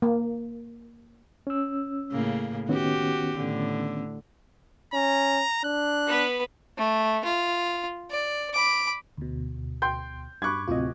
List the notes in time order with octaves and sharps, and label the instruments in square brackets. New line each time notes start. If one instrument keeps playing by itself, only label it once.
[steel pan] A#3
[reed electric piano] C#4 E6
[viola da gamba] A2 C#3 A#3
[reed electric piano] D#3 B3 C#4 [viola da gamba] F#4 G4
[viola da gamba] A2 D3
[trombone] C#4 [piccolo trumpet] A#5
[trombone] D4 [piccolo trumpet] F#6
[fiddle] B3 B4
A3
F4
D5
B5 D6
[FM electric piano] D2 B2
[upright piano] G5 C6 G6
[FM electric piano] G2 [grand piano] B5 D6 F#6 [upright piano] C#6 G#6
[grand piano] D1 C3 [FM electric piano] F4 D#5